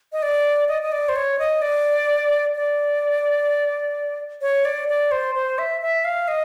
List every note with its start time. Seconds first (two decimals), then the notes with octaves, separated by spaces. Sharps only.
0.13 D#5
0.22 D5
0.68 D#5
0.82 D#5
0.92 D5
1.09 C5
1.16 C#5
1.39 D#5
1.62 D5
2.55 D5
4.42 C#5
4.65 D5
4.88 D5
5.11 C5
5.35 C5
5.58 E5
5.81 E5
6.05 F5
6.28 D#5